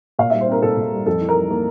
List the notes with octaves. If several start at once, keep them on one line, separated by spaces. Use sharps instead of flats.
A#2 F5
G3 E5
C5
C4 A#4
A#2 A4
A#2
G3
F2 A4
E3
A#4
G3
A#3